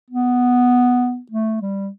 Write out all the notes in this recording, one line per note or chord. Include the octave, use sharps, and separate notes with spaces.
B3
A3
G3